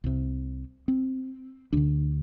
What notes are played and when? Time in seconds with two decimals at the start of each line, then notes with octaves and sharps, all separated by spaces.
0.04 C2 C3
0.88 C4
1.73 D2 D3 D4